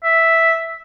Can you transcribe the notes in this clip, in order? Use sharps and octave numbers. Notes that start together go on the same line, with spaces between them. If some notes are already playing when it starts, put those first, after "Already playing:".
E5